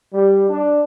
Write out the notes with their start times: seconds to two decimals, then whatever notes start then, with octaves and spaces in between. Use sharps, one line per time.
0.14 G3
0.50 D4